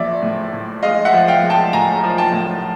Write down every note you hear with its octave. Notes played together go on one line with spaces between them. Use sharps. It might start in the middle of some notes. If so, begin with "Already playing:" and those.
Already playing: A#1 D5 E5
A2
A2
G#3 D#5 F5
E5 F#5
F3
F5 G5
G#3
G5 A5
A2 G#5 A#5
F3
G5 A5
A2